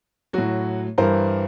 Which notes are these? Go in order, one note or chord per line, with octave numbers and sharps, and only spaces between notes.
A2 F#3 F#4
G2 E3 G3 A#4 C5